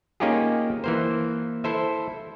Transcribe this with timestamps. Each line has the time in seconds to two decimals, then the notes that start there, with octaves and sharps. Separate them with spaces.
0.20 A#3 C#4 D#4 F4 G4 G#4
0.84 E3 A#3 C5
1.64 E4 A4 C5 E5